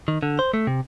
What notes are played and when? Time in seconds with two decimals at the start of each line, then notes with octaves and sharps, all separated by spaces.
0.08 D#3
0.23 D3
0.39 C5
0.54 A3
0.67 C3